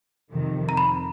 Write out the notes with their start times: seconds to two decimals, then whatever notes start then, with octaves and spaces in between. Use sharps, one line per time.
0.31 F2 C3 D#3
0.69 A#5
0.77 B5